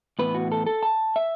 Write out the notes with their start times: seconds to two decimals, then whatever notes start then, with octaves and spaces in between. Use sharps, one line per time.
0.19 A2 E3 B3 B4
0.35 F#4
0.52 A4
0.67 A4
0.83 A5
1.16 E5